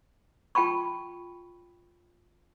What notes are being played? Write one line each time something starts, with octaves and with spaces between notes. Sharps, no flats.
F4 G5 A5 B5 C#6